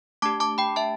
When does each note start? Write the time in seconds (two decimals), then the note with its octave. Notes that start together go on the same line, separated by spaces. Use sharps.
0.22 A3 D4 G4 A5 D6
0.40 A5 D6
0.58 G5 B5
0.76 E5 A5